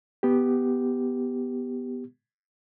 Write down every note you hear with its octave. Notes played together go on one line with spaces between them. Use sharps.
B3 G4